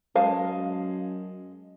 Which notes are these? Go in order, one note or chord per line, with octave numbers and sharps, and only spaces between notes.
F#2 G#3 F5 A5